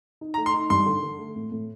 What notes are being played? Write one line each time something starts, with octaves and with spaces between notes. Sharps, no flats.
D#4
A#5
A3
C6
D#4
G2 C6
D3
D3
A3
A2
A2